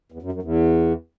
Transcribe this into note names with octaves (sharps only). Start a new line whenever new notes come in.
E2
F#2
F#2
E2